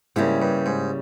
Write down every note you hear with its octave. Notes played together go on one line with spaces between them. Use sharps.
G#2 C#3 G3 A#3 E4 G#4
G2
G#2